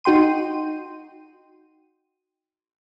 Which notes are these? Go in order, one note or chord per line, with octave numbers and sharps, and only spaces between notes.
D#4 F#4 G5 C6 D#7